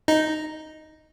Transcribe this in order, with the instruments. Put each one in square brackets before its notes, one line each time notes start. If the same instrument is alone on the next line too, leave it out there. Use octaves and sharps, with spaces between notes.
[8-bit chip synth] D#4